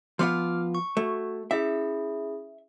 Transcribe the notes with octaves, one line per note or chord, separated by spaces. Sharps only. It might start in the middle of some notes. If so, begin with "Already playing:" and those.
F3 B3 F4 D6 F6
C#6
A3 F#4
C#4 E4 G#4 E5